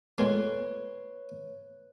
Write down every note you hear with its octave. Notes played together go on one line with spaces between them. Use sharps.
A#2 G#3 A3 B4 C#5